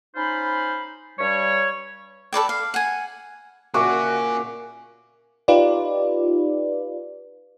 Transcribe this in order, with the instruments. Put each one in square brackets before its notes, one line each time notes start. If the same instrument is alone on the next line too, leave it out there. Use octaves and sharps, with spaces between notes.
[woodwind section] C#4 D#4 F4 C5 B5
G2 G3 C#5
[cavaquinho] A4 B4 D5 G5
F5
F#5 G#5
[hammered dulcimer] A#2 E5 [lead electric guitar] C#4 G#4 [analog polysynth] F#4 [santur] D6
[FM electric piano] D#4 F4 G4 B4 D5